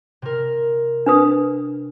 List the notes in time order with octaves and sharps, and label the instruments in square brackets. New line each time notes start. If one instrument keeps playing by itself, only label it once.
[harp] C3 A#4
[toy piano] D4 B4 D#6